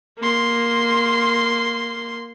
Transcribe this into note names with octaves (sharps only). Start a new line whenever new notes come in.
A#3 C6